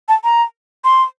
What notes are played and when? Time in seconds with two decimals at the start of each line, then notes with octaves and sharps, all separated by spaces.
0.09 A5
0.24 A#5
0.84 C6